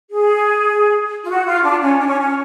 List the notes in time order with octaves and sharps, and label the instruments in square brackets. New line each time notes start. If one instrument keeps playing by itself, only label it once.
[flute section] G#4
F4
F#4
F4
D4
C#4
D4
C#4
C#4